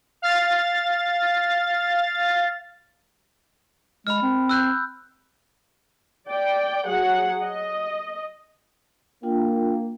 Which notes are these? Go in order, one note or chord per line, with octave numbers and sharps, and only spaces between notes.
F5 A6
G#3 B5 F6
C4
E6 F#6 G6
D5 G5
F#3 G#4 F#5
D#5
A#3 D4 F4 G5